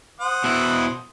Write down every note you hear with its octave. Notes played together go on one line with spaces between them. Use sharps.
C5 F#5 D#6
B2 E4